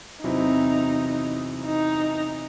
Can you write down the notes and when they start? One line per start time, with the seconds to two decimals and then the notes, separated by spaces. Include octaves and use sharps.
0.23 E2 C3 F#3 C4 D#4 E4
1.66 D#4